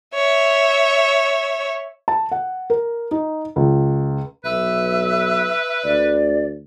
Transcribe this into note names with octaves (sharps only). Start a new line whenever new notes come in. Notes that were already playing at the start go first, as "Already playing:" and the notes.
C#5 E5
A5
F#5
A#4
D#4
C#2
B1 B4 E5
D2 D5